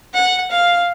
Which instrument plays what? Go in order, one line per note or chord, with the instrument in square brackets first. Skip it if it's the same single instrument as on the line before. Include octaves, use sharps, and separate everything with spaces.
[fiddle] F#5
F5